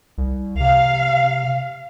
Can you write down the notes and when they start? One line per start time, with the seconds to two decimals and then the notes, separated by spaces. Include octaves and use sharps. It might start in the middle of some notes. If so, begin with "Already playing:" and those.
0.18 C2
0.60 C3 F5